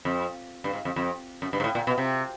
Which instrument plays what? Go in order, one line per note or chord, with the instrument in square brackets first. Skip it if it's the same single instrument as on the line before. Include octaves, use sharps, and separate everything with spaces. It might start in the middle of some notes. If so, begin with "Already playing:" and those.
[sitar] F2
G2
G#2
F2
F2
F#2
G2
G#2
A2
A#2
B2
C3